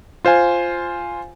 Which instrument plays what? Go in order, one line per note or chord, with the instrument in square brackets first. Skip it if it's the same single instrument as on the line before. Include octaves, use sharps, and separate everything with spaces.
[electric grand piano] F4 C5 F5 G#5